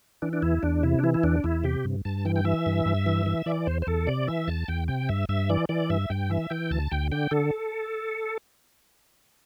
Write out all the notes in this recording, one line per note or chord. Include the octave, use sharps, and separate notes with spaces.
E3 D4
D4
E2 E4
E2 D4
C3 E4
D4
E3 E4
E4
E2 D4
E2 E4
C3 G4
G2
G2 A5
E3 G5
G5
E3 E5
G2
G2
E3
E3
E3 D5
E2 C5
C5
E2 A4
C3 D5
E3 E5
E2 A5
E2 G5
C3 G5
G2 E5
G2 E5
E3 D5
E3 D5
G2 E5
G2 G5
E3 E5
E3 G5
D2 A5
D2 G5
D3 G5
D3 A4